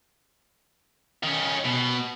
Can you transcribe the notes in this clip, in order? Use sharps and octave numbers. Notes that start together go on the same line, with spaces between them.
D#3 C#4
B2